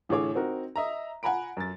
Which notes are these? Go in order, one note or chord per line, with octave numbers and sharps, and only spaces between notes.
A1 A2 D3 G#4 C#5 D6
C4 D#4 F#4 A#4
D#5 E5 A#5
F#5 G#5 A#5 B5 D7
F#2 A6